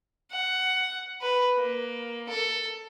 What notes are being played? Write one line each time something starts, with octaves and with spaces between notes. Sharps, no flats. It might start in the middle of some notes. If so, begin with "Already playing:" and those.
F#5
B4
A#3
A4